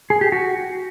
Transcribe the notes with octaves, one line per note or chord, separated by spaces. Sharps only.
G#4
G4
F#4